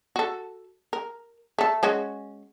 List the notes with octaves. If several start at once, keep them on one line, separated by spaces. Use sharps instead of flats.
F#4 A4
A#4
A3 A4
G#3 C#4 F#4